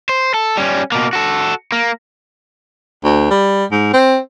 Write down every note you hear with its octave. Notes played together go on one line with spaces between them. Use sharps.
C5
A4
G3 C#4
B2 A#3
F#4 A4
A#3
D2
G3
G#2
C4